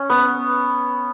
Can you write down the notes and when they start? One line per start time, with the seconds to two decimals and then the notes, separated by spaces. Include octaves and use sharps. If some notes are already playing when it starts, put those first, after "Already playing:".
Already playing: C#4
0.10 B3